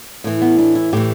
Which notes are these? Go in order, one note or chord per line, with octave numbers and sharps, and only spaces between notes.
A2 E3
B3
D4
E4
A2 E3 G4